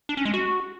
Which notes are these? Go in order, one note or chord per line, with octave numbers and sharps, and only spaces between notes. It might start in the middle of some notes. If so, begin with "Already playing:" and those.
D4
C#4
G#3
F#4